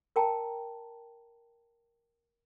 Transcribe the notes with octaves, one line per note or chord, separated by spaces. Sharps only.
A#4 G5 A5 A#5